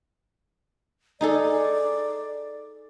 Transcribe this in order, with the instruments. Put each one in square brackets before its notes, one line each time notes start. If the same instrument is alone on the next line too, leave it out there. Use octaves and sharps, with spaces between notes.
[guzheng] D#4 G#4 A4 [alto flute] D5